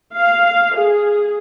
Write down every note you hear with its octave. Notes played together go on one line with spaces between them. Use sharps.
F5
G#4